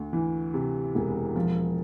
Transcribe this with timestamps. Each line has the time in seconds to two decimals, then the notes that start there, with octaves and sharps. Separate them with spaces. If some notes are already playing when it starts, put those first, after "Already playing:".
Already playing: D2
0.13 E3
0.54 C3
0.95 E1
1.36 F3